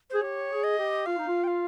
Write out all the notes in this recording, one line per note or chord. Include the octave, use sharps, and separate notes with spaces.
G#4 C5
G4 C#5
G#4
D#5
G4
F4 F5
D#4
F4
G5
F5